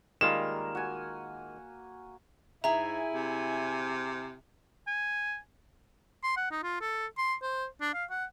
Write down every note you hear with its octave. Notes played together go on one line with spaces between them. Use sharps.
D#3 G3 G#3 A#3 F4 A#4 E7
F#4 G#5
G#2 E4 G#4 E5 G#5 A#5
C3
G#5
C6
F#5
D#4
F4
A4
C6
C5
D4
F5
F#5